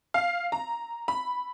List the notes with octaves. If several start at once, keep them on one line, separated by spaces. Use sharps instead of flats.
F5
A#5
B5